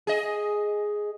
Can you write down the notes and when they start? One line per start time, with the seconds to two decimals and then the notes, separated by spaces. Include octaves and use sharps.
0.07 G#4 D#5